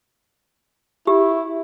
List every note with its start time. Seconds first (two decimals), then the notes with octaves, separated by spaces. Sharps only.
1.07 E4 G4